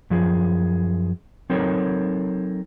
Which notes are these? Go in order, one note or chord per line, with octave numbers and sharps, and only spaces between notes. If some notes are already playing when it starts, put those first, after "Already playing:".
F#2 F3 G#4
F#3 C4 D#4 A4 A#4 C#5